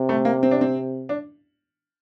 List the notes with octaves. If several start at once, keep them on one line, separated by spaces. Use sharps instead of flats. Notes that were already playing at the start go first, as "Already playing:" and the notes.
Already playing: C3
A3
A#3
C4
D4
C4
D4